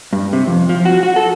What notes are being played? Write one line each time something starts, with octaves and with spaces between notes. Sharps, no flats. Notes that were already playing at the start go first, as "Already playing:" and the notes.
G2
C3
F2
F3
F#4
F#4
A4